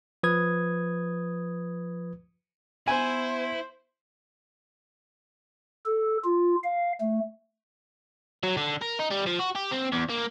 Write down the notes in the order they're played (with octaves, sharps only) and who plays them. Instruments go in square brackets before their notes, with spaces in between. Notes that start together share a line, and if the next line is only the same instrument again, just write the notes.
[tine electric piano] F3 B4 D#6 G#6
[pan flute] B3 [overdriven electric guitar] E4 [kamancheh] C5 [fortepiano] G#5
[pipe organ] A4
F4
F5
A3
[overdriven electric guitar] F#3
D3
A#4
D#4
G3
F3
F#4
G4
C4
E2
A#3